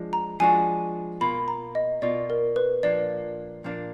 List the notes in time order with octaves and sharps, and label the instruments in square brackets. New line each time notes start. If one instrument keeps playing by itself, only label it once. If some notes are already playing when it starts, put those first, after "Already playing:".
Already playing: [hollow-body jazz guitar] F3 G#3 D4
[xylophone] A#5
[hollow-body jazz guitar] F3 G#3 D4 F#4 [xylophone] G#5
[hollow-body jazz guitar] B2 A#3 F4 [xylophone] B5
[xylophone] A#5
D#5
[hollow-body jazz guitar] B2 A#3 F4 [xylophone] D5
[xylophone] A#4
B4
[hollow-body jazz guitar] A#2 F3 A#3 D4 [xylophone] D5
[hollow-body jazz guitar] A#2 F3 A#3 D4